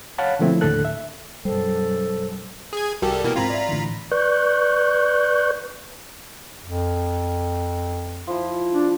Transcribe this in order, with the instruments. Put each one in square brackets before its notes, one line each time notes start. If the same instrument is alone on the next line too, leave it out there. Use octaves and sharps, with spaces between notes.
[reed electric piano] C#5 F5 F#5 A5 B5
B2 D3 F3 A3 C4 E4
D#2 A2 D3 A4 F#6
E5
[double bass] F#2 B2 [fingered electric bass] G3 [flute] A4 [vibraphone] C5
[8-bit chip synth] G#4 G#6
[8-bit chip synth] C2 G3 A4 [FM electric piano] F#4 A#4 G5
[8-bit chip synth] B2 E3 A#3
[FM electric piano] G#2 C4 G#6 [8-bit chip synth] F4 A#5 B5
[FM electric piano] D5 E5
A2 D3 E3
[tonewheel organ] B4 D5 C#6 F#6 G6
[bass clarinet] F2
[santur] F3 E4
[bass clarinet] D4